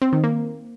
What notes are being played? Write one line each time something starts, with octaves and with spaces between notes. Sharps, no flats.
C4
D#3
A#3